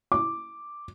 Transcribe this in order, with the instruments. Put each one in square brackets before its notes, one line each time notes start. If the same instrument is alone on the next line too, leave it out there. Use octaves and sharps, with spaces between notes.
[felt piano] D6